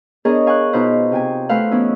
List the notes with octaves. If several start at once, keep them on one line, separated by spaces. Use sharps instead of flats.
B3 D4 G#4 A#4 C#5 D#5
F5 G#5 C#6 D6 F#6
B2 D#4 F4 B4 C5 D#5
C3 G5 G#5
A3 B4 C5 F5 F#5
E3 F#3 B3 C#4 D#4 E4